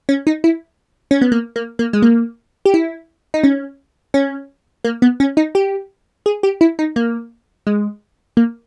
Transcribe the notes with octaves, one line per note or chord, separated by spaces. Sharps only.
C#4
D#4
E4
C#4
B3
A#3
A#3
A#3
G#3
A#3
G4
E4
D#4
C#4
C#4
A#3
B3
C#4
D#4
G4
G#4
G4
E4
D#4
A#3
G#3
A#3